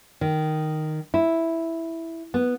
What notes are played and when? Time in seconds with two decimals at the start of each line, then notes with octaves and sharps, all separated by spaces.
0.21 D#3
1.14 E4
2.34 B3